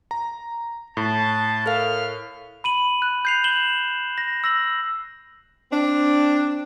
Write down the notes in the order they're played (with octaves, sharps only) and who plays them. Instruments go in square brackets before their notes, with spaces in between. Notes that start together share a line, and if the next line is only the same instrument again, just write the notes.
[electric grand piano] A#5
[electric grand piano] A2 [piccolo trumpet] A5
[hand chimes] A4 A#4 F5 [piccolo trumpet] F6
[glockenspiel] B5 D#7 F#7
F#6
G6 C7 F7
E7 F#7 G7
A#6
E6 A#6 F#7
[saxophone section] C4 D4